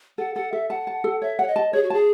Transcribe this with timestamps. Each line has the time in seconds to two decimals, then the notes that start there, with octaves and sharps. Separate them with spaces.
0.18 A4 F#5
0.35 A4 F#5
0.52 A4 E5
0.69 F#5 A5
0.87 A5
1.04 A4
1.22 C#5 E5
1.39 C#5 F#5
1.47 D#5
1.56 A5
1.73 G#4 C#5
1.83 F#4
1.90 G#4 A5